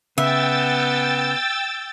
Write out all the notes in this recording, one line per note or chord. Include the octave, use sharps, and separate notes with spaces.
C#3 B3 E5 G5 E6 A6